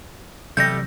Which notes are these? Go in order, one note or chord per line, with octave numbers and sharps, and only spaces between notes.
C3 E3 F#3 G3 A3 G6 A#6